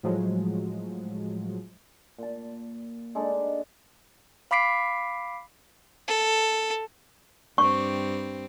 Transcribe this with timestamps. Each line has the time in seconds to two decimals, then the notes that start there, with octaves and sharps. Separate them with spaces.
0.03 A2 F3 F#3 G#3
2.18 A#2 A5
3.15 G#3 D4 D#4 A4
4.51 F5 B5 D6 B6 C7 D7
6.08 A4
7.58 G2 C4 C#6